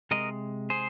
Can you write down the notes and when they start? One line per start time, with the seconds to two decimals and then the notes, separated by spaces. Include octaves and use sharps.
0.11 C3 G#3 A#4 D#5
0.70 G#4 C5